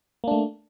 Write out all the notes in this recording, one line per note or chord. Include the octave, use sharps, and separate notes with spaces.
A3 A#3 D4